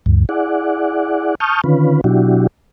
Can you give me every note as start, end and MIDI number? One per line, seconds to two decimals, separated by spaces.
0.06 0.25 38
0.06 0.25 43
0.29 1.35 64
0.29 1.35 68
0.29 1.35 74
0.29 1.35 78
1.40 1.61 81
1.40 1.61 85
1.40 1.61 87
1.40 1.61 89
1.40 1.61 91
1.64 2.01 50
1.64 2.01 51
1.64 2.01 61
1.64 2.01 65
1.64 2.01 71
2.04 2.47 47
2.04 2.47 54
2.04 2.47 62
2.04 2.47 64
2.04 2.47 66
2.04 2.47 67